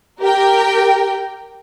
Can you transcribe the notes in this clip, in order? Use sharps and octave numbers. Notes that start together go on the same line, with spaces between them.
G4 A#4 G5